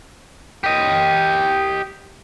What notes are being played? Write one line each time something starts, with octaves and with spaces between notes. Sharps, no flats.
G4 D#5